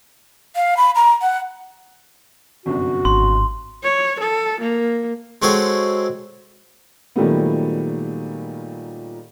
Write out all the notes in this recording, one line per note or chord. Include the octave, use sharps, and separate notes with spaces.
F5
B5
A#5
F#5
G1 C2 F#2 F#4
G#1 C6
C#5
A4
A#3
G#3 C4 F#4 A4 C5 C#5
A#2 D#3 F#3 G3 A3 B3